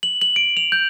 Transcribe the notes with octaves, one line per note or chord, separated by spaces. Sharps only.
F#7
F#7
D7
F7
G6